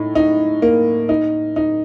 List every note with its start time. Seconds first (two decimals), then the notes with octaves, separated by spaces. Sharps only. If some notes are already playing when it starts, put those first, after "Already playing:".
Already playing: A2 D#4
0.15 D#4
0.62 A#3
1.09 D#4
1.56 D#4